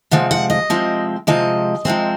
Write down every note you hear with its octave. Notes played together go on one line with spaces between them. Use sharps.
C3 F3 G#3 C4 F#5
F#5
D#5
C3 F3 G#3 C4
C3 F3 G#3 C4 D#5
C3 F3 G#3 C4